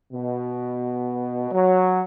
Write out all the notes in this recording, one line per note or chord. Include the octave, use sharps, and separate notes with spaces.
B2
F#3